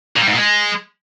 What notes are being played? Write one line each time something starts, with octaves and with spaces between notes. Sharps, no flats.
A#2
G3
G#2
A#2
G#3